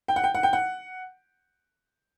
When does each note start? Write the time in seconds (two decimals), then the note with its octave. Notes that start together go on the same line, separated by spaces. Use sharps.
0.08 G5
0.16 F#5
0.24 G5
0.35 F#5
0.43 G5
0.53 F#5